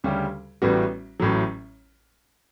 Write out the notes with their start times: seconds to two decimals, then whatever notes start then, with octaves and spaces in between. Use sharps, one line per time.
0.04 D2 C#3 G3 C#4 G4
0.62 A1 A2 G3 B3 F#4
1.20 A1 A2 F#3